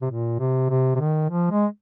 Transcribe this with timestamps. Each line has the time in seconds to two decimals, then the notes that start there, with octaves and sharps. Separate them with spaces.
0.02 C3
0.10 A#2
0.39 C3
0.70 C3
0.96 C3
1.00 D#3
1.30 F3
1.51 G#3